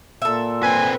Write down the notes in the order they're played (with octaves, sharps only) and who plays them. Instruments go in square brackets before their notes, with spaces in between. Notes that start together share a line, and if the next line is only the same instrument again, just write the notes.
[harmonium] A#2 [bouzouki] A4 E5
[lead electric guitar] C4 B4 [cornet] G#5